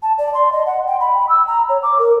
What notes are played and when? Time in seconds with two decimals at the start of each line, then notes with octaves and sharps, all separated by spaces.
0.03 A5
0.18 D5
0.34 C6
0.52 D#5
0.66 F#5
0.87 G5
1.00 B5
1.29 E6
1.47 A#5
1.69 C#5
1.83 D6
1.99 A#4